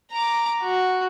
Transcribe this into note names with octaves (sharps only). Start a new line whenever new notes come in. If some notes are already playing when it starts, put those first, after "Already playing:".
A#5 D6
F#4